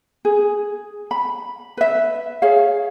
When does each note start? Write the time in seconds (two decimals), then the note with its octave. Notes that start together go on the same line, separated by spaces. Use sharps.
0.25 G#4
1.11 B5
1.77 B4 E5
2.42 G#4 C#5 F5